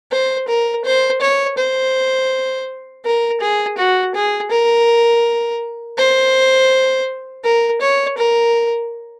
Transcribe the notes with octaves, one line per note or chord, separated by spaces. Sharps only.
C5
A#4
C5
C#5
C5
A#4
G#4
F#4
G#4
A#4
C5
A#4
C#5
A#4